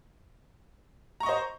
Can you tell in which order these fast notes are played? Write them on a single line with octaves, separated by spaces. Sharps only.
A#5 C#6 D#5 C5